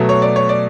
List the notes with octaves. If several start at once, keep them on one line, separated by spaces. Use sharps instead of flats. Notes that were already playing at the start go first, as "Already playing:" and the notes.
Already playing: B2 F#3 A3
C#5
D5
C#5
D5